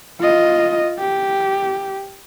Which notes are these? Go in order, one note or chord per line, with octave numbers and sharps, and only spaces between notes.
F4 D#5
G4